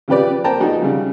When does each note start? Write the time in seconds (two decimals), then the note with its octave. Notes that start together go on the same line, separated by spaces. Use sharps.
0.08 C#3 F3 G4 B4 D5
0.44 A#3 C5 G5 A5 A#5
0.60 F3 D#4 F#4 G#4
0.82 C#3 G3